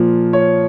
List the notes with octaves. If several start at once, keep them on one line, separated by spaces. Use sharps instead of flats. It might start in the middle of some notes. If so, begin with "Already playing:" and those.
Already playing: A#2 F3
C#5